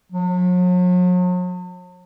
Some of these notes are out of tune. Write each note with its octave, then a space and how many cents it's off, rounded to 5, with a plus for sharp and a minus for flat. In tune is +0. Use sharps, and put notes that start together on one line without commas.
F#3 -45